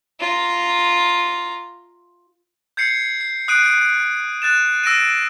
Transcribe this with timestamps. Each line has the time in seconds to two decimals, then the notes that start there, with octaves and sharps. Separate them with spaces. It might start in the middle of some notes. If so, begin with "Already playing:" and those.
0.20 F4 A#5
2.77 G6 G#6 C7 C#7
3.21 C7
3.48 D#6 F#6 C7 D7 D#7
3.66 F#6
4.42 F#6 A6 E7
4.84 E6 A#6 D7 D#7